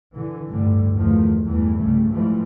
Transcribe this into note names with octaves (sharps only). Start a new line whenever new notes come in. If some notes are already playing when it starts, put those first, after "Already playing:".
D3 E3
G1 D2 A2 D3 G3
G1 E2 D#3 F3 A3
E2 G2 E3 G3 A3
C2 G2 C#3 G3 A3
G#2 E3 F3 G3 A3